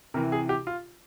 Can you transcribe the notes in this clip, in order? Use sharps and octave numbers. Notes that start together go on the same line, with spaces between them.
C3 E3 A#4
G#4
G4
F4